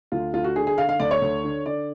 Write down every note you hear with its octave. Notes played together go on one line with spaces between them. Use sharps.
D2 F4
D2 F4
F#4
D3 G#4
G#4
D3 F5
F5
D2 D5
C#5
D2
D3
D3 D5